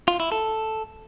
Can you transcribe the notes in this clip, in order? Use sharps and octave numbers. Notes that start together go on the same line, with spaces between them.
F4
E4
A4